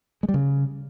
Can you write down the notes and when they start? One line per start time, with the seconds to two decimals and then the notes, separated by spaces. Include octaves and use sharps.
0.23 G#3
0.29 G3
0.34 C#3